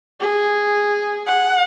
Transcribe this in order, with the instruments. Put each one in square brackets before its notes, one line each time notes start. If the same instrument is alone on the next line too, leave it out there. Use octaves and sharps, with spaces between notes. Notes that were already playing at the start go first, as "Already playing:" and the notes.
[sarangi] G#4
[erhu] F#5